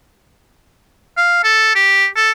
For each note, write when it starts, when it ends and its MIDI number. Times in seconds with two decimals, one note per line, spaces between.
1.17 1.41 77
1.44 1.74 69
1.75 2.07 67
2.16 2.31 69